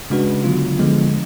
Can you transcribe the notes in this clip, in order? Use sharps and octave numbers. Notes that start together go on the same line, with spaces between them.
C#3 G#3 D4 F#4 B4
D3 F#3 B3 F4
D3 F3 G#3 B3